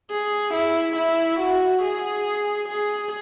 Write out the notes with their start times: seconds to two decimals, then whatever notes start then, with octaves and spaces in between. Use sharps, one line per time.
0.10 G#4
0.53 E4
0.96 E4
1.39 F#4
1.82 G#4
2.68 G#4